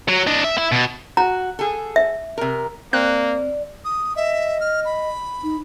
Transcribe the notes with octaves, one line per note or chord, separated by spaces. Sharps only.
F#3
D4 D#5
E5
E4
B2
F#4 A#5
G#4 A4
E5
C3 A#4
A#3 C4 D5 F#6
D#6
D#5 E5
F6
B5
D#4